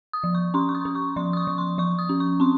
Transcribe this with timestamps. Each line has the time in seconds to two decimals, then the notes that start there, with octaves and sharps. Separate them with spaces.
0.13 D#6
0.24 F3
0.35 C#6
0.54 C#4 C6
0.69 C#6
0.75 D#6
0.85 C#4
0.95 C#6
1.16 F3 C6
1.33 D#6
1.37 C#6
1.47 F3
1.58 C6
1.78 F3 C#6
1.99 D#6
2.09 C#4
2.20 C#6
2.40 C4 C6